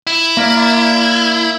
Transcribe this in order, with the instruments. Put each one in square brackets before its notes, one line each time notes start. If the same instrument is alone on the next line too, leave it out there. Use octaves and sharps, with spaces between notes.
[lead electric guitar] E4
[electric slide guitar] A#3 A#4 D5